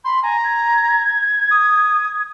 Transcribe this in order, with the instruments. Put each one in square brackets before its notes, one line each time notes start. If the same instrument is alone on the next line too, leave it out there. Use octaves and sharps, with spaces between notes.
[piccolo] B5 [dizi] C6
[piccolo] G#5 [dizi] A#5
[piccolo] G#6
[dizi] D#6